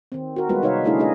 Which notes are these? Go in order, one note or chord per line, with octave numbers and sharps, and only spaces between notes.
D#3 C4
F#4 A#4
G3 G#3 B3 F4 F#4 B4
C3 D#4 B4 C#5 E5 F5
D3 A3 D4 E4 G#4 F5
A3 C#4 D4 G#4 D#5